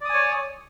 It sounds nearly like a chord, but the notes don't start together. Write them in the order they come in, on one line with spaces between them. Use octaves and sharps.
D5 D#6 G#5 C#5